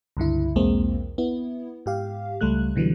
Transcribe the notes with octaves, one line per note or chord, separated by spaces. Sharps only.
C#2 G2 D3 E4
B1 E2 G#3 A#3 C4
B3 E4
G#2 G4 F5
C#2 G3 A3 F#6
B2 D3 E3 F#3 G3